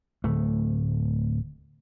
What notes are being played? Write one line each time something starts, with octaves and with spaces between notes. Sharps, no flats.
D1 A3